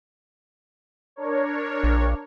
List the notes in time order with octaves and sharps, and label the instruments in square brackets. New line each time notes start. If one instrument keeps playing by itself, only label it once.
[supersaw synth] D4 A#4 C#5
[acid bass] A#1